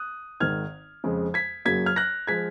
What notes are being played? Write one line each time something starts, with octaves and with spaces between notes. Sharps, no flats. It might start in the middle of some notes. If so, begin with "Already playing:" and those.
Already playing: D#6 F#6
G#1 G#2 D#3 F6 G#6
F2 C#3 G#3
G#6 B6
F#2 C#3 F#3 A#3 G#6 B6
F6 G#6
F#6 A#6
F3 G#3 G#6 B6